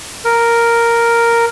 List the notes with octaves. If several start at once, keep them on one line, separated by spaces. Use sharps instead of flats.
A#4